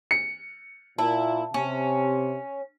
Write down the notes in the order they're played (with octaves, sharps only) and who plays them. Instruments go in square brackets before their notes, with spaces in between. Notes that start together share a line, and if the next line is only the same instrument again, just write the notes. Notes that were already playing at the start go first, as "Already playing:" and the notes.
[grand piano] C#7
[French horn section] A#2 [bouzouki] E4 [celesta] A5
[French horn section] C3 [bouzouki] C#4